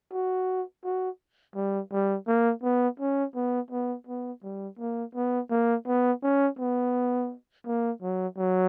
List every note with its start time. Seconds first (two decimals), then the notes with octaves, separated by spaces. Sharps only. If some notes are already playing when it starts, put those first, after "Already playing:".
0.13 F#4
0.84 F#4
1.55 G3
1.92 G3
2.27 A#3
2.63 B3
3.00 C#4
3.35 B3
3.71 B3
4.07 B3
4.43 G3
4.79 A#3
5.15 B3
5.50 A#3
5.87 B3
6.23 C#4
6.59 B3
7.66 A#3
8.02 F#3
8.38 F#3